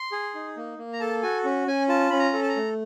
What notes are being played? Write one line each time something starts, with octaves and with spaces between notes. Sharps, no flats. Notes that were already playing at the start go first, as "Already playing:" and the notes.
Already playing: C6
G#4
D#4
A#3
A#3
A#5
A4 A5
F#4 G#5
C#4
C#4 G#5
F4 A5
C#4 B5
A#5
A4
A5
A#5
A3